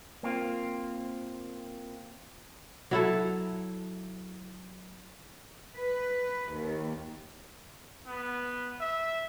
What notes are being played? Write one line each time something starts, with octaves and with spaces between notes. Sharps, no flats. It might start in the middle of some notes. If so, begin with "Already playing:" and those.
A#3 C4 F4
F#3 E4 A4
B4
D#2
B3
E5